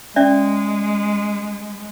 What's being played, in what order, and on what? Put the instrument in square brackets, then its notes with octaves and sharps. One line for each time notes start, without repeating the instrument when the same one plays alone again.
[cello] G#3 [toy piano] C#4 D5 E5